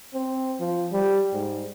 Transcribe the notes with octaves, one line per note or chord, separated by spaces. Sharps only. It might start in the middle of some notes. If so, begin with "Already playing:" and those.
C4
F3
G3
G#2